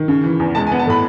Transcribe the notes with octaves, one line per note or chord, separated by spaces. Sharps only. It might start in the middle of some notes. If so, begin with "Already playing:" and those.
Already playing: D#3
C#3
E3
E2
G#3 A5
G#5
B3
A5
A2 B5